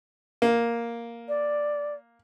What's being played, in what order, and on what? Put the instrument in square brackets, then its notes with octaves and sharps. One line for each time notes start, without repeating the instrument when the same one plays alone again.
[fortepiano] A#3
[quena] D5